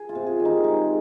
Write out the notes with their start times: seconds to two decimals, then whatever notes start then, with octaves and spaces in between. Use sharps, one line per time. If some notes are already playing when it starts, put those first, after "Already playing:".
Already playing: G#4
0.09 F4
0.15 C3
0.27 G#4
0.39 D#3
0.45 D#4
0.64 G#3